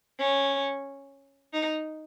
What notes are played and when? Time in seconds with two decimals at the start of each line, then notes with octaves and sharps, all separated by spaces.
0.20 C#4
1.53 D#4